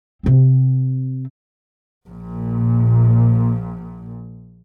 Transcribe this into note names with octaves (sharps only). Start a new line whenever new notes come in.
C3 C4
A#1 A#2